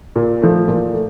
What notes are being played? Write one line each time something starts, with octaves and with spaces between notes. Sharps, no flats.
A#2
F3 A3
A#2
A3